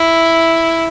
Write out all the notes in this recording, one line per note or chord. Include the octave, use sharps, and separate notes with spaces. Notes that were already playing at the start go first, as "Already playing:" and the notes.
Already playing: E4